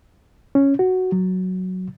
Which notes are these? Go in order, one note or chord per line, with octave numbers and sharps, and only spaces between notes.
C#4
F#4
F#3